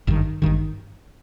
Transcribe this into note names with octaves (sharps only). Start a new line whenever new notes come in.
G#1 G2 D#3
G#1 G2 D#3